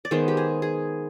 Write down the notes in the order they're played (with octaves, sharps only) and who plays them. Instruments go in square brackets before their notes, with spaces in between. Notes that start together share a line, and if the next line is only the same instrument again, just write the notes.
[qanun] D5
D#3 G#3 B3 C5
G4
G#4
G#4